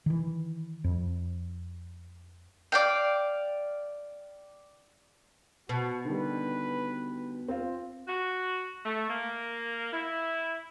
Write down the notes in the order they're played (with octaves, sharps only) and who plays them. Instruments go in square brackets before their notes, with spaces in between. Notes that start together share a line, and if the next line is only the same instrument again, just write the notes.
[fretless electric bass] D#3 E3
F2
[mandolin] D5 F5 G5
[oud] B2 [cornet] F#4
[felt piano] D3 D#3 G3 [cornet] B4
[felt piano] C4 F4
[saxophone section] F#4
A3
A#3
E4